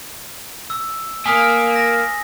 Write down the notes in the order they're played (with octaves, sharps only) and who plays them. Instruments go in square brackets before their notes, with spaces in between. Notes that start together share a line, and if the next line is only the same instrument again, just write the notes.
[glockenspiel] E6
[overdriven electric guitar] A#3 [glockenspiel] G#5 D#6 B6
[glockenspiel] A#6